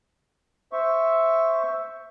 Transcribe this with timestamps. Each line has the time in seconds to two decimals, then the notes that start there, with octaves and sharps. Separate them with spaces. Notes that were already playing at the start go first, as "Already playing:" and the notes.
0.73 C5 E5 C#6